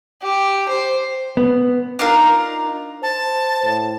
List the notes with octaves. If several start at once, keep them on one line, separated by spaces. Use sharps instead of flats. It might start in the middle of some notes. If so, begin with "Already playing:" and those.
G4
C5
B3
D4 D#4 F4 A#4
C5 A5
A2